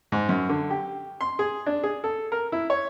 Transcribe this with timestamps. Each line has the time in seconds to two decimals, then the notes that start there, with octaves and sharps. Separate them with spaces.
0.12 G#2
0.29 F#2
0.49 D3
0.70 G4
1.21 C6
1.39 G#4
1.66 D4
1.83 G#4
2.04 A4
2.32 A#4
2.52 E4
2.70 C#5